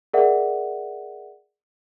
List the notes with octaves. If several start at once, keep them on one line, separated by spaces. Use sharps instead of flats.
G#4 A#4 D5 E5 F#5